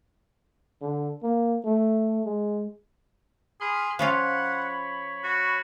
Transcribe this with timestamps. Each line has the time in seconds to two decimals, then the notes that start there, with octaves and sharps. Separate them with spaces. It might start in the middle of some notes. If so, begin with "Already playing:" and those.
0.82 D3
1.23 A#3
1.65 A3
2.25 G#3
3.61 G#4 B5 C6 F6
3.99 F3 C#4 F4 C#5 F#5 B5
5.24 F#4